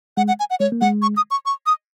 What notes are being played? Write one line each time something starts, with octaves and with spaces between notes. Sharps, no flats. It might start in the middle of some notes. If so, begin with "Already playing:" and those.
G#3 F#5
F#5
G#5
F#5
G#3 C#5
A#3
G#3 F#5
C#6
D#6
C#6
C#6
D#6